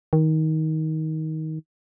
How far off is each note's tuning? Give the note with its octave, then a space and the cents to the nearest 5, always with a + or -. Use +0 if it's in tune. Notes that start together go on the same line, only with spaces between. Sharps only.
D#3 +20